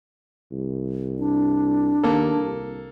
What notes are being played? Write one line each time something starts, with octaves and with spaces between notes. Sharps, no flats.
C2
D4
D#2 A#3 A4
C2